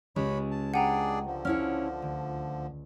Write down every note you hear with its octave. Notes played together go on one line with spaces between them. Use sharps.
C#2 G#3 G4 C#5 B5
A5
D4 G#4 D5 F#5 G5 A#5 D#7
D3 F3
C#4 E4 C#5 F6
D2